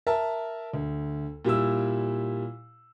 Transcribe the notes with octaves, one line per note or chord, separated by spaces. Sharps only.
A#4 E5 A5
D2
A#2 G3 E4 E6